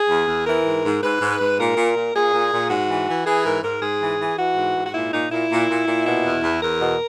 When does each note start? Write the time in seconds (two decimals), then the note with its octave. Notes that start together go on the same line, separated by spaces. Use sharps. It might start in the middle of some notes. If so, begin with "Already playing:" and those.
Already playing: G#4
0.09 E2
0.27 E2
0.46 E3 A#4
0.65 G#2
0.84 G#2
1.02 G#2 B4
1.21 G#2
1.40 G#2
1.59 A#2 A#4
1.76 A#2
1.95 A#2
2.14 A#2 G#4
2.33 A#2
2.52 A#2
2.70 G#2 F#4
2.89 E3
3.08 E3
3.25 E3 G#4
3.45 G#2 A#4
3.63 G#2 A#4
3.81 G#2 G#4
4.00 E3
4.19 E3
4.38 E3 F#4
4.56 G#2
4.75 G#2
4.85 F#4
4.93 A#2 E4
5.12 A#2 D#4
5.30 A#2 E4
5.50 A#2
5.69 A#2
5.87 A#2
6.05 B2 E4
6.24 E2
6.42 E2
6.61 E2 A#4
6.80 B2